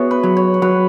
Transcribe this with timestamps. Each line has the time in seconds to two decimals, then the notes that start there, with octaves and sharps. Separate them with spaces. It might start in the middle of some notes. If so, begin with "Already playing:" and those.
Already playing: B3 E4 F#4 G#4 C#5
0.11 B4
0.24 F#3
0.37 C#5
0.54 C#5
0.62 F#3 B4